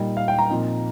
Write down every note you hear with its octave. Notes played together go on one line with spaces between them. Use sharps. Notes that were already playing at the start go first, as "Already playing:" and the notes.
Already playing: A#2 G3 D#4
F5
G5
A#5
A#2 F3 C4 D#4